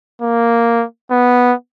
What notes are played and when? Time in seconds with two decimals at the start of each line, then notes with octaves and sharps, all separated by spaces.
0.22 A#3
1.11 B3